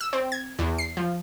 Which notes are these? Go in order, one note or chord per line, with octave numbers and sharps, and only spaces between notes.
E6
C4
G#6
E2
C7
F3